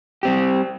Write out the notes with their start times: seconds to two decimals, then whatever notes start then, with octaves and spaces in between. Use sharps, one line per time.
0.23 G3 C4 G4